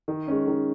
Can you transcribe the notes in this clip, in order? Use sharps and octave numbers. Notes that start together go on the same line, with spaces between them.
D#3
G#3 C#4
D#3